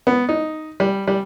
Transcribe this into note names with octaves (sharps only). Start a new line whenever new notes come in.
B3
D#4
G3
G3